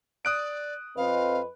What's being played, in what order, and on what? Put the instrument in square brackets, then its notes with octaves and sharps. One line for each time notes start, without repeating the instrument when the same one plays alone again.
[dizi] D5 [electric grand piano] D#6 F#6 D7
[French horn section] F2 C4 D#5 [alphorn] B4 [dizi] F5